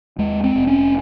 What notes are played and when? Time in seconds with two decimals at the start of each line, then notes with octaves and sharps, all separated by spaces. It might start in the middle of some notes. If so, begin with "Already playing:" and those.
0.18 D#2 G#3
0.44 C4
0.56 F1
0.67 C#4